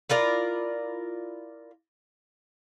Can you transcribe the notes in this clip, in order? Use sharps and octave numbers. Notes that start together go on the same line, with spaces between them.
E4 F4 A#4 D5